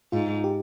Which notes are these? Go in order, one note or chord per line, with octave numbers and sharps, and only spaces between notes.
G#2 F4
G4